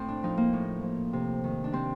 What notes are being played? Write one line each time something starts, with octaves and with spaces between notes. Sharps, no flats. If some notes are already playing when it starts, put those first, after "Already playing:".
Already playing: A2 C4
D4
F3 D#4
A#3
A2
F3
C3
D#3
D4
C3 C4